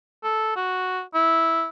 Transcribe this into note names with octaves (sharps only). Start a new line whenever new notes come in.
A4
F#4
E4